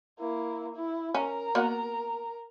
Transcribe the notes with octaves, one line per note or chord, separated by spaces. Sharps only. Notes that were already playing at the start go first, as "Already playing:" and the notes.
A#3 E4
E4
C#4 A#4 A#5
A#3 B3 F#4